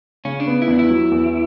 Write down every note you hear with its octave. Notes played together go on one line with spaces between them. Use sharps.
C#3 C#4
D4
B3
E4
E2 D4
E4
F#3
E2